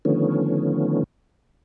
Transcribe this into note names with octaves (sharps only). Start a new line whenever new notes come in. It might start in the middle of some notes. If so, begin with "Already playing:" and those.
D3 D#3 F3 A3 B3 C#4